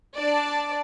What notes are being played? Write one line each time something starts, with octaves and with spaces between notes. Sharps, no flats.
D4 D5 A5